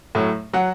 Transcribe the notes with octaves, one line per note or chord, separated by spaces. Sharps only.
A2 F#3
F#3 F#5